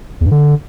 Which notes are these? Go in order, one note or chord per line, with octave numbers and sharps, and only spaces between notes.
E2
G2
D3